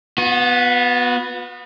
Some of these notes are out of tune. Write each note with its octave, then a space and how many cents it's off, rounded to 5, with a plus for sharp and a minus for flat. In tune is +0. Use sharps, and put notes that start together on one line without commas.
B3 +0 F#4 -45